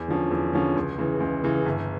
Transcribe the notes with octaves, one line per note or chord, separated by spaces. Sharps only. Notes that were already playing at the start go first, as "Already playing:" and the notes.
Already playing: E2
D3 F3 C#4
E2
D3 F3 C#4
C#2
C#3 E3
C#2
C#3 E3
G1